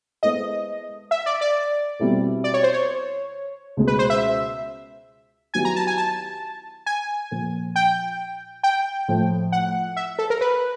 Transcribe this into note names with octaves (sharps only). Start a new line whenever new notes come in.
G#3 B3 E4 A4 C5 D#5
E5
D5
D5
B2 G3 C4 E4 A4
D5
C#5
C5
C#5
C#2 B2 G#3
B4
C5
E5
D#3 F#3 B3 E4 G4 G#5
A#5
A5
G#5
A5
G#5
A#2 F3 A#3
G5
G5
A2 F3 A3
F#5
E5
A4
A#4
B4